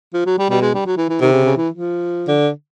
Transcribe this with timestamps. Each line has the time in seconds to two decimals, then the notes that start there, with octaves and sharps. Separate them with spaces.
0.14 F3
0.26 F#3
0.39 G3
0.50 B2 G3
0.61 G#3
0.74 G3
0.86 F#3
0.97 E3
1.09 E3
1.21 C3 D#3
1.32 C#3
1.45 C#3
1.57 E3
1.74 F3
2.28 D3